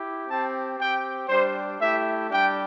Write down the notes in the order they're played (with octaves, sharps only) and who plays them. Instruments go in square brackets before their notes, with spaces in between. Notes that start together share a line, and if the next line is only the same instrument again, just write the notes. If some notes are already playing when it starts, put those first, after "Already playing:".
Already playing: [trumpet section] E4 G4
C4 G4 A5
C4 G4 G5
G3 D4 G4 C5
A3 E4 G4 E5
G3 D4 G4 G5